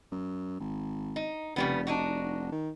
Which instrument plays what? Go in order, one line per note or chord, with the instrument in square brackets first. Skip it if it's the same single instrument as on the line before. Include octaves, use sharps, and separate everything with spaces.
[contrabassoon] F#2
G#1
[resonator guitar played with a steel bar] D#4
[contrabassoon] F1 [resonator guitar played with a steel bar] C#3 G3 B3
[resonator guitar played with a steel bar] D4 D#4 F#4
[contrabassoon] D#3